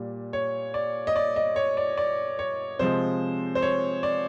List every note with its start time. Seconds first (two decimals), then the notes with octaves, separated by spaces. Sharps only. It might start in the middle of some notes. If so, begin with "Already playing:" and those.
Already playing: A#2 G3
0.33 C#5
0.74 D5
1.07 D#5
1.16 D5
1.36 D#5
1.56 C#5
1.77 D5
1.98 D5
2.39 C#5
2.79 C3 F3 G#3 C5
3.55 C5
3.62 C#5
4.03 D5